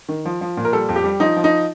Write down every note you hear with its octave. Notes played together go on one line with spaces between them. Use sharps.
D#3
F3
F3
A#2
A#4
G3 A4
F2
G4
G3
F3 D#4
F3
D#4